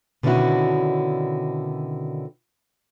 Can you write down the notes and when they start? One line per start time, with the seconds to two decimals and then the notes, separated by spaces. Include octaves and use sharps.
0.23 B2 D3 D#3 C#4 E4 F#4